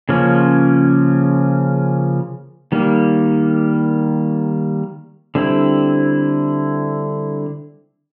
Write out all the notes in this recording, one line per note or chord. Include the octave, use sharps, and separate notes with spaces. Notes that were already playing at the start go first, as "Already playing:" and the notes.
C#3 F3 A#3 C#4
D#3 G3 A#3
D3 G3 C4 E4